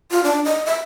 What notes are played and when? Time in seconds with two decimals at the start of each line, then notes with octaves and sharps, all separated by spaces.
0.11 F4
0.24 D4
0.45 D#5
0.66 E5